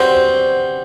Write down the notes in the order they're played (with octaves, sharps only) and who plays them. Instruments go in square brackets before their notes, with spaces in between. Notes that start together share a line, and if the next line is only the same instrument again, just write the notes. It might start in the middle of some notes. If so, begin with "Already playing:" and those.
Already playing: [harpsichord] G3 C4 F#4 B4 [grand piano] C5